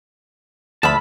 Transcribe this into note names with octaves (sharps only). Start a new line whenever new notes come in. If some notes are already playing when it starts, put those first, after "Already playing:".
D2 F3 E5 A5 B5